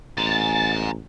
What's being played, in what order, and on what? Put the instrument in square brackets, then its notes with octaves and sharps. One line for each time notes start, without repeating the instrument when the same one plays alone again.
[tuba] A1 [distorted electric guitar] G#5 A#5 [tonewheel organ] A6